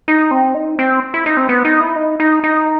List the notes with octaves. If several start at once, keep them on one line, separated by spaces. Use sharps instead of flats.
D#4
C4
D#4
C4
E4
D#4
C4
B3
D#4
E4
D#4
D#4
D#4